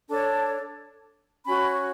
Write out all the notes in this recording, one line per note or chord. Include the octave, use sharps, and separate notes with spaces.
D4 A4 C#5 A5
C#4 F#4 C#5 B5